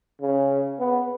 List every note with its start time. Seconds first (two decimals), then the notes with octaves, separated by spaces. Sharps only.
0.21 C#3
0.79 B3